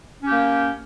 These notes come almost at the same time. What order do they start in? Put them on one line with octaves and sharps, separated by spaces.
C#4 G4 A#3